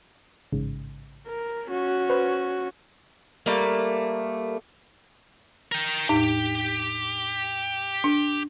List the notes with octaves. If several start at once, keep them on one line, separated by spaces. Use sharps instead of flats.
A1 G#2 C#3
A#4
C#4 F#4
B4 C5 F6
G3 A3 A#3
A#4 G5
E2 A2 D#4 G4
D4